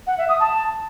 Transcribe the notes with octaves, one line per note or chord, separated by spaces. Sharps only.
F#5
E5
D#6
A5